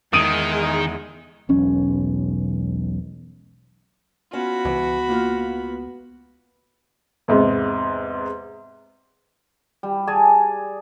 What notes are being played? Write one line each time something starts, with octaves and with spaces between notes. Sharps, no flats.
E2 D#3 G#3 G#4 D#6 D7 D#7
E1 B1 C#4
B3 C#4 F4 F#4 F5 B5
C#2 E3
A#3 F4
E2 G#2 C3
G3
G#4 D5 G#5 A5